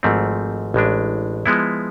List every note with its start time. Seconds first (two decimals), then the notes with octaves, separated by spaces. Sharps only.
0.03 G#1 G#2 F3 A3 C4
0.74 A1 A2 G#3 D4
1.46 F3 G#3 B3 E4